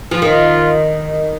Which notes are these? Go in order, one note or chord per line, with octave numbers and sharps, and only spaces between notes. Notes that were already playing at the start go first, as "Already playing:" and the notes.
F3
D#3 F4